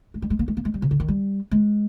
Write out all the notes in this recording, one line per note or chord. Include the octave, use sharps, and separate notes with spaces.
G#3
G3
G#3
A#3
G#3
A#3
G#3
G3
C3
D3
D#3
G3
G#3